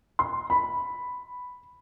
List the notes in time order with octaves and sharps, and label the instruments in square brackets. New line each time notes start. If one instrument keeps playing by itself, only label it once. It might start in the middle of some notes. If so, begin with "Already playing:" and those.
[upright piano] C6
B5